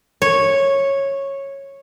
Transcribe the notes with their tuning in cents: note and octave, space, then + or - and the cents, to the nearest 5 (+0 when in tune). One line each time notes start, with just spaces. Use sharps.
C#5 -10